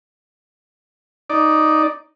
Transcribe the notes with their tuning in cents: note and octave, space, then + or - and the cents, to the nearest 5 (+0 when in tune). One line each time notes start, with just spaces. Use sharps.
D#4 +0 D5 +0